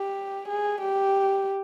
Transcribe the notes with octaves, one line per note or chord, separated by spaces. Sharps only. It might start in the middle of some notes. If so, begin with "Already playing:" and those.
Already playing: G4
G#4
G4